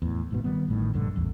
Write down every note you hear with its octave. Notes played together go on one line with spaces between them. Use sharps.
E2 A2
G#1 G#2 B2
D#3 G3 B3
A1 A2 D#3
A#1 G2 D3
A1 E2